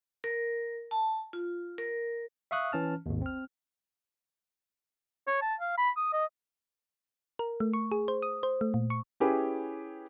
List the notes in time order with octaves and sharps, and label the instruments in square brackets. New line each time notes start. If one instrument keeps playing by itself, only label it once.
[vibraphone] A#4
A5
F4
A#4
[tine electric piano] E5 F5 C#6 D#6 F#6
E3 C#4 A5 F6
G#1 D#2
C4 F6
[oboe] C#5
A5
F5
B5
D#6
D#5
[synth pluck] A#4
A3
C#6
G#4
C5
D#6
C5
A3
A#2
C#6
[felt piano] C#4 E4 G4 G#4 B4